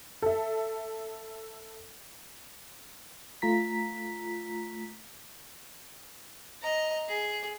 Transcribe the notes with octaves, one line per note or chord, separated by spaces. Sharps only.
A4 E5
A3 F4 A#5 B6
D#5 A#5
G#4